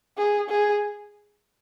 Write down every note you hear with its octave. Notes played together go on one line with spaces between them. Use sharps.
G#4
G#4